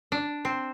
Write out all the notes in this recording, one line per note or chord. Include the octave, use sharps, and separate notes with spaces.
D4
C4